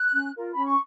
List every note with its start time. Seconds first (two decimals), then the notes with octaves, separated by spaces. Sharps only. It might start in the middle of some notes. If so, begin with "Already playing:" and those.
Already playing: F#6
0.12 C#4
0.34 F4 A#4
0.54 C#4 B5
0.66 C#6